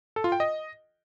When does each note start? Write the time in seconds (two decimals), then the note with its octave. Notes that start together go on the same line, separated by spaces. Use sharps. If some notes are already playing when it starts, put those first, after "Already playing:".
0.16 A4
0.24 F4
0.32 G5
0.40 D#5